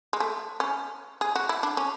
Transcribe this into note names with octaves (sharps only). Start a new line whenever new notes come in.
G#3
A3
C#4
G#4
F#4
E4
D4
C#4